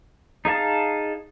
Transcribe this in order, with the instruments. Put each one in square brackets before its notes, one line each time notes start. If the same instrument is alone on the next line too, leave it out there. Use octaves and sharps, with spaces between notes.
[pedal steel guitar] D#4 G#4 F5 A5